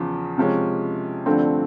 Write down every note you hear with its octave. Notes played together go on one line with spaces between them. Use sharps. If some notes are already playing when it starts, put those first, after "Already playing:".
Already playing: E2 C#3 F3
C3 F3 G#3 C#4
G2 D3 F3 A3 C4